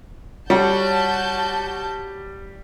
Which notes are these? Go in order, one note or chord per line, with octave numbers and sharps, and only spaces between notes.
G3 F4 F#4 C#5 F#5 A5 C6 G6